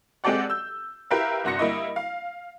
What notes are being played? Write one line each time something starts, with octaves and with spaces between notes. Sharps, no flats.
G#3 C4 G4 A4 D5 F#5
E6 G6
E4 G4 A#4 B4 E5 F5
G1 C2 F#4 C6 A#6 C#7
G3 A#3 E4 D#5
F5